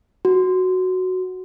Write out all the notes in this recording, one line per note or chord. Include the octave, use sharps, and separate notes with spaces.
F#4